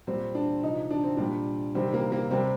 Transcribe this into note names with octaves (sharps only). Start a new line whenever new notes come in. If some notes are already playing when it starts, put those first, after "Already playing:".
A#2 G3 C4
D4
C3 F3 D#4
D4
C4
A#2 G3 D4
C3 D#3 G3 C4
A#3
A#3
C3 G3 C4